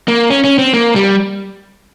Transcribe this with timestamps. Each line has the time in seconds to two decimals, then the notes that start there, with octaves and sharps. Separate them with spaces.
0.08 A#3
0.30 C#4
0.44 C#4
0.58 C4
0.74 A#3
0.96 G3